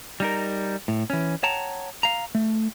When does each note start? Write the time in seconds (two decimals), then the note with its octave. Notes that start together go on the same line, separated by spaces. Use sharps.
0.20 G3 D#4 A#4
0.88 A2
1.10 E3 C#4
1.43 C#5 F#5 G5 A5 A#5
2.03 F5 A#5
2.35 A3